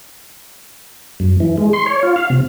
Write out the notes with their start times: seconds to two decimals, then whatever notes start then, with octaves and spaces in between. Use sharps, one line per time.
1.20 F#2
1.40 E3
1.58 G#3
1.73 C6
1.86 C#5
2.03 F4
2.16 F5
2.30 C3